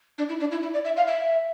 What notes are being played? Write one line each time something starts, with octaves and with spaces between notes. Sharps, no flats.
D4
E4
D4
E4
E4
D5
E5
F5
E5